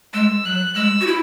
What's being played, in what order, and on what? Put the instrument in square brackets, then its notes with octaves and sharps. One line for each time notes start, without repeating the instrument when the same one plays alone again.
[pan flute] G#3 [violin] E6
[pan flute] F#3 [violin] F#6
[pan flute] G#3 [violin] E6
[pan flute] F#4
E4